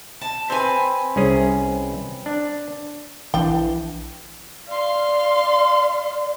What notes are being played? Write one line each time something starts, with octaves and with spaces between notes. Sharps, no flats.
A5
C4 B4 G#5
C2 C#4 G#4
D4
A#1 E3 D4 G5
D5 F5 C6